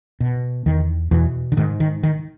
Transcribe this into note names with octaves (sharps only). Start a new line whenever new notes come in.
B2
E2 D#3
E2 B2 E3
D3
G#2 D#3
D#3
D#3